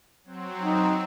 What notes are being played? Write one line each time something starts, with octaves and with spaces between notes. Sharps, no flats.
F#3 C4
D#4